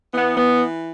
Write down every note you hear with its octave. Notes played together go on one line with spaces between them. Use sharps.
E3 B3
B3